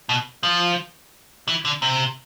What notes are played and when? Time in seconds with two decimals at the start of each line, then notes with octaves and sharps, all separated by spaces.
0.09 B2
0.43 F3
1.48 E3
1.65 D3
1.82 C3